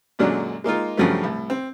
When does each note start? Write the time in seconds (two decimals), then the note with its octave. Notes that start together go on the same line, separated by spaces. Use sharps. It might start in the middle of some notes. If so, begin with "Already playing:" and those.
0.19 F#2 A#2 D3 F#3 G#3 D4
0.64 G#3 A#3 D#4 F4
0.97 G2 C#3 F3 F#3 A3
1.23 C2 A2
1.50 C4